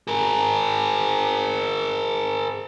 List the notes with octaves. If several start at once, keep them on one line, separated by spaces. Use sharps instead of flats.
G#4 A#4